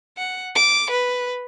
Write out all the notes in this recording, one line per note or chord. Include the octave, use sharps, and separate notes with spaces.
F#5
D6
B4